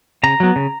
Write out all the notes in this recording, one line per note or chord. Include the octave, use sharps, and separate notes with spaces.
C#3 A#5
F#3 B3
C#3